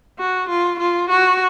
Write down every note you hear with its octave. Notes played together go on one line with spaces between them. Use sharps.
F#4
F4
F4
F#4